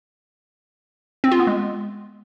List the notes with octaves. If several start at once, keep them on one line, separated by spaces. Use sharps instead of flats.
C4
F4
B3
G#3